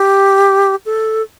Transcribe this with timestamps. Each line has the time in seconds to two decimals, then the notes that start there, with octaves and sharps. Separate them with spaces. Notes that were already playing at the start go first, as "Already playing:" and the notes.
Already playing: G4
0.86 A4